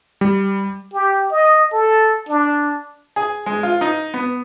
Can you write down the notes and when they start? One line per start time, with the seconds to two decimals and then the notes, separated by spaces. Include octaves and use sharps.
0.21 G3
0.93 G4
1.32 D#5
1.72 A4
2.29 D4
3.16 G#4
3.46 G#3
3.63 F4
3.81 D#4
4.14 B3